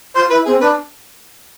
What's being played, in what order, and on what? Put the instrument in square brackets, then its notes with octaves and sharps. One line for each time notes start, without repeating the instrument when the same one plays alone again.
[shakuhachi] F4 [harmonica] C5
[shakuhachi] E4 [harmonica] B4
[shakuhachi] C4 [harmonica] G#4
[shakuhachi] D4 [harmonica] B4